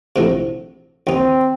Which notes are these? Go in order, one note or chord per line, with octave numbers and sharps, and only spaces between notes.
A#1 A2 C3
D#2 C4 D#4